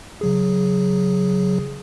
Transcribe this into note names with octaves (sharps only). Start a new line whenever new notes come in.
C#3 F#3 G#4